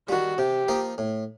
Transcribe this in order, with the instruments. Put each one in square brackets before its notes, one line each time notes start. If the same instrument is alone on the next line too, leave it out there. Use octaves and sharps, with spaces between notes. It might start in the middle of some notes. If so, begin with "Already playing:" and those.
[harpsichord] D#3 G3 [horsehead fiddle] F#4
[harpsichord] C3 [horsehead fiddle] G4
[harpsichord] F3 A#3 D#4
A2